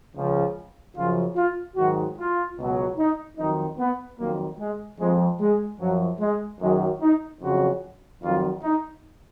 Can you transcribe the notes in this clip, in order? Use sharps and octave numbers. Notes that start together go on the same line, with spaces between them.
C#2 C#3 F3
F#2 C#3 F3 F4
F4
G#2 D#3 F#3 F#4
F4
C#2 B2 F#3
D#4
F2 D#3 F#3 D#4
B3
F2 D#3 F#3 A#3
G#3
F2 F3 G#3
G#3
F#2 F3 F#3
G#3
F#2 D#3 F#3 G#3
D#4
F2 C#3 F#3 F#4
F2 D#3 F#3 F4
D#4